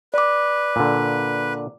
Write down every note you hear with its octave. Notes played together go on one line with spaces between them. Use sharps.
B4 D5 D6
A#2 D3